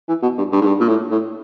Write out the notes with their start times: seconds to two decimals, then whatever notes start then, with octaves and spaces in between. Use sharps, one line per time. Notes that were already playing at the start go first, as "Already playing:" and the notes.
0.08 E3
0.22 B2
0.38 G2
0.52 G2
0.61 G#2
0.66 G2
0.80 A#2
0.88 A2
1.11 A2